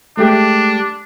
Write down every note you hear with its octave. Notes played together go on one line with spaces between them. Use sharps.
G#3 A3 D4 G4